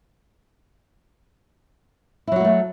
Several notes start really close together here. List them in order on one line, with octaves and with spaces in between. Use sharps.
E4 F#3 F#4 A#3 A3